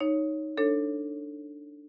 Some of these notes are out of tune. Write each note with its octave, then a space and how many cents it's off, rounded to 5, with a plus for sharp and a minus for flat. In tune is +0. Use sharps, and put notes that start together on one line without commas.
D#4 +0 C#5 +0
D4 +0 A4 +15 C#5 -15